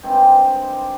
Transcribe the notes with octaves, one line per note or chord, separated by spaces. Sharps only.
G2 D#3 G#3 C4 G4